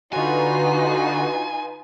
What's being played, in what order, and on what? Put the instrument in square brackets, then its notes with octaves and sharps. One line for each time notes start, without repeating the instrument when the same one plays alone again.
[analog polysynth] D3 F#4 [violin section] D#4 F4 B4 [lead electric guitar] G#5